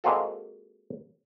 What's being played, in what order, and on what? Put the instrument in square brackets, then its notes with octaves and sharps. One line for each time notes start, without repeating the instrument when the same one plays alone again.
[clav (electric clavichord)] G#3 A#3 C4 F4 F#4 A4